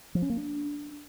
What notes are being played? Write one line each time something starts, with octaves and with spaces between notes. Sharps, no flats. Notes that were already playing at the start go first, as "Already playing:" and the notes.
F3
C#4
A#3
D4